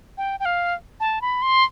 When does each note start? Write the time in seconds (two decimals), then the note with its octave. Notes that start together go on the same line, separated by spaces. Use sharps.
0.18 G5
0.40 G5
0.45 F5
1.00 A5
1.22 B5
1.42 C6